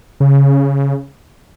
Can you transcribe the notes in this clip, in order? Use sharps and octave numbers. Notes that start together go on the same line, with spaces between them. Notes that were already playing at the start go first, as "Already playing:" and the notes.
C#3